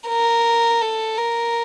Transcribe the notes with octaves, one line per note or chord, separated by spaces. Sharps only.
A#4
A4
A#4